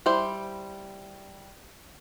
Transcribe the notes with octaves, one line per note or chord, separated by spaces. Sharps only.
G3 E4 C5